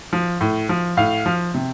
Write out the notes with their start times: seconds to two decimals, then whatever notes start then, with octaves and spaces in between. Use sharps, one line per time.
0.13 F3
0.41 A2
0.69 F3
0.97 A2 F5
1.26 F3
1.54 C3